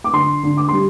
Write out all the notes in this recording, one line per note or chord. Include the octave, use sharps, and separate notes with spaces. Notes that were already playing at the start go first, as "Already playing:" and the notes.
D6
D3 C6
D3
D6
G3 C6